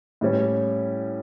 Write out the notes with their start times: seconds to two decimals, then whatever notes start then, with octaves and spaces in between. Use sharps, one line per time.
0.21 A2 G3 C#4